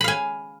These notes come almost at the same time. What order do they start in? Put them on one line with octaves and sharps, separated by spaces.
B5 F5 G#5